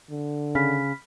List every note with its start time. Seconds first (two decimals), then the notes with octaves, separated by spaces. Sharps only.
0.10 D3
0.55 C#3 B5 F6 B6